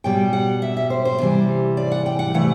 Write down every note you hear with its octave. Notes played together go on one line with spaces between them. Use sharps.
B2 G3 G5
F#5
E5
E5
C5
C5
C3 E3 G3
D5
F#5
G5
F#5
C3 E3 A3 F#5